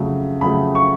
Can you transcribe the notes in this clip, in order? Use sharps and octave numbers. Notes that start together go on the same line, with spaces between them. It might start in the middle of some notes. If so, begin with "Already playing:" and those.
Already playing: F2 C#3 F#3 A3
F2 C#3 F#3 A3 B5
C#6